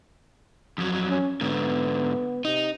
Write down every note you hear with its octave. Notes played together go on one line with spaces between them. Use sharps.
F2 F#3
C#4
G#2 D3 B3
C3 D#4